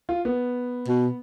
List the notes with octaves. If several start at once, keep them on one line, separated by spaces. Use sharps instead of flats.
F4
B3
B2